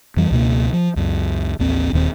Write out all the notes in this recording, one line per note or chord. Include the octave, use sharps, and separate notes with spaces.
F2 E3 G3
C#2 B2 A#3
F3
C#2 F#2
A1 D#2 C4
D#1 D#2 C#3 C4